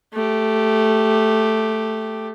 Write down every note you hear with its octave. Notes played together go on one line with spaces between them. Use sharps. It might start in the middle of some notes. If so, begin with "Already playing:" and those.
A3 G4